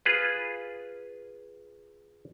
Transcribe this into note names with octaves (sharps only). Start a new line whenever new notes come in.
F4 G#4 B4